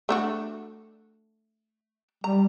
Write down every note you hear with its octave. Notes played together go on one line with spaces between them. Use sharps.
A3 D4 F#4
G3 A#5